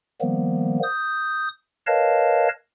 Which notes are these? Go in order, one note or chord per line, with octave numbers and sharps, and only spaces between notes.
D#3 F3 G3 A#3 B3
D#6 G6
A#4 B4 C#5 D#5 F5 A5